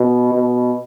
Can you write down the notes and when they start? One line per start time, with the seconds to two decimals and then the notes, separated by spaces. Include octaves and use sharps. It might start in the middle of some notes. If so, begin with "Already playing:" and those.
Already playing: B2
0.33 B2